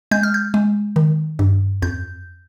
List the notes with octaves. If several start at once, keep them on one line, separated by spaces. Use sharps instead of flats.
G#3 G6
F6
G6
G#3
D#3
G2
F2 G6